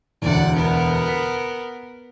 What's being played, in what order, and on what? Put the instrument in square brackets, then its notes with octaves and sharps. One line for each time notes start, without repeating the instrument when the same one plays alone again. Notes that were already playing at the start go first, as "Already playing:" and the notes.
[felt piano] E1 D2 [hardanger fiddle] D5 F#5
[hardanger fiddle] B3 A#4
[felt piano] B6